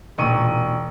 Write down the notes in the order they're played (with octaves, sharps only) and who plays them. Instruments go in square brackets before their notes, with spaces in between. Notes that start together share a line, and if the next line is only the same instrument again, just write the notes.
[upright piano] E1 C#6 D#7 [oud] A#2 D#4